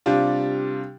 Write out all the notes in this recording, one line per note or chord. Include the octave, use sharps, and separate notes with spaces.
C3 G3 D4 F4